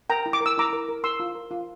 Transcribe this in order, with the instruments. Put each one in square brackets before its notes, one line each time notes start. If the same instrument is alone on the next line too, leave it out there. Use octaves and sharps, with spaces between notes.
[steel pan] A#4 G5 A#5
E4
D6
A#4
E6
E4 A#5 D6
A#4
A#4
A#4 C6 E6
F4
A#4
F4